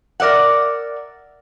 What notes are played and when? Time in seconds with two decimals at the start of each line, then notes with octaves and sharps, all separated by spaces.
0.20 A#4 D5 E5 F#5